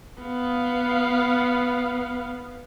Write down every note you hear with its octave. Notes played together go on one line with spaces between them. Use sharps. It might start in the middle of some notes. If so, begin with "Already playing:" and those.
B3 F5